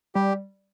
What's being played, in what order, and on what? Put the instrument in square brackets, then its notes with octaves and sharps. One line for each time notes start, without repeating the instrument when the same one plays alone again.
[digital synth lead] G3 [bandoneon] G4